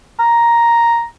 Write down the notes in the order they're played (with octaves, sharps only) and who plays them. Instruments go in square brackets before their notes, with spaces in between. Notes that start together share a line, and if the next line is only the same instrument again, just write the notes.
[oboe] A#5